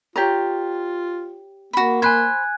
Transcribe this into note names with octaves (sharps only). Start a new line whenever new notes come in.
F4 G4 C#5 A#5
A#3 F#4 B5
C5 G#5 B5 F#6 G#6